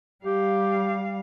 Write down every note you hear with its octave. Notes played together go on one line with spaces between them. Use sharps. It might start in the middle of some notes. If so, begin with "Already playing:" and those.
G3 G4 F5